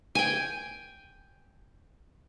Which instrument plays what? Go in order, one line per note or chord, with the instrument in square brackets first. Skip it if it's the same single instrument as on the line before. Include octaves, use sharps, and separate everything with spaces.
[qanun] G5 G#5